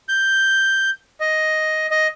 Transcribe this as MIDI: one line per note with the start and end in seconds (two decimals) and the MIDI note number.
0.09 0.90 91
1.20 1.87 75
1.91 2.07 75